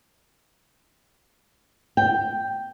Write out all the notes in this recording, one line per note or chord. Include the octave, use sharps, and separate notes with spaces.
G5